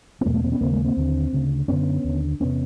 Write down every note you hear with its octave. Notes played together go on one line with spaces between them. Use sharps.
B3
E2 B2 G#3 A#3
A3 B3
A#3 C4
B3 C#4
D#2 C#3 A#3 C4
G#3 A#3
A#3 C4
D#2 D3
D2 C#3
F#2 D3 B3 C#4
D#2 D3
E2 C3 B3 C#4